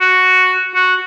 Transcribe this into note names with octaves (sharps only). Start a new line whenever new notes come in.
F#4
F#4